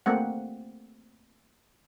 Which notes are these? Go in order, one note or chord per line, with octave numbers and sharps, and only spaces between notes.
A3 A#3 C4 F#5